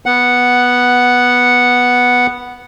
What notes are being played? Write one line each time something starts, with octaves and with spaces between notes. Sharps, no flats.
B3 F#5